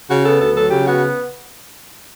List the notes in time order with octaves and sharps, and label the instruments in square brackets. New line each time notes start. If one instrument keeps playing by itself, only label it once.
[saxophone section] C#3 F#4
B3 A4
D2 A4
F#3 A4
C#3 G4
B3 F#4